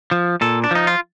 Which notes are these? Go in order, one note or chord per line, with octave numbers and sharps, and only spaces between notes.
F3
A#2 A4
D4
F3 D#4
F4